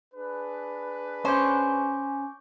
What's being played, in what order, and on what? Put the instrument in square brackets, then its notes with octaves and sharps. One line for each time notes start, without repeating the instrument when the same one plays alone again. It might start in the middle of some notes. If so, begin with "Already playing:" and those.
[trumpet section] D4 G#4 B4
[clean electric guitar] C#4 [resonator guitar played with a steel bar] C5 [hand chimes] C#6 D6 G6